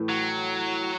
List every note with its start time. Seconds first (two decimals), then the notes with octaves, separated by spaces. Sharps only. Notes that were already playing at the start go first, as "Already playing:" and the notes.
Already playing: A2 E3 A3
0.09 F#3